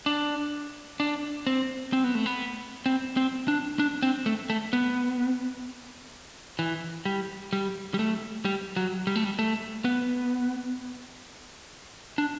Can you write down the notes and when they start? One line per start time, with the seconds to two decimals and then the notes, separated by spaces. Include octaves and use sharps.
0.06 D4
1.00 D4
1.47 C4
1.93 C4
2.04 B3
2.15 A3
2.26 B3
2.86 C4
3.17 C4
3.48 D4
3.79 D4
4.03 C4
4.26 A3
4.50 A3
4.73 B3
6.59 E3
7.05 G3
7.53 G3
7.94 G3
7.99 A3
8.45 G3
8.76 F#3
9.07 G3
9.15 A3
9.24 G3
9.39 A3
9.85 B3
12.18 D4